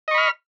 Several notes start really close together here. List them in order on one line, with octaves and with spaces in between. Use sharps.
D#5 C#6 B5 F6